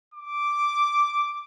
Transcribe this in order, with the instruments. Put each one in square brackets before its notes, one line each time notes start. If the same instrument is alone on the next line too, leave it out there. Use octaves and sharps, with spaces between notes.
[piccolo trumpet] D6